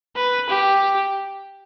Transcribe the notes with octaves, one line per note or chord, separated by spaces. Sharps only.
B4
G4